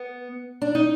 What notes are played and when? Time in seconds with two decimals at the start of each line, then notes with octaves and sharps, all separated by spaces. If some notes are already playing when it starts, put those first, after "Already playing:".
Already playing: B3
0.62 D4
0.75 D#4